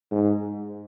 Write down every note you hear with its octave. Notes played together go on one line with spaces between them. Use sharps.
G#2